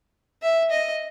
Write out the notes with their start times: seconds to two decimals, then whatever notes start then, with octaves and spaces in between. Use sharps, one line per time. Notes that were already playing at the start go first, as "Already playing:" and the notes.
0.42 E5
0.71 D#5